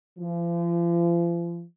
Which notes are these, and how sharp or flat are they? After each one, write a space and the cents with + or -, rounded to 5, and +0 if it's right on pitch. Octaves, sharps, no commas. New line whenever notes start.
F3 -40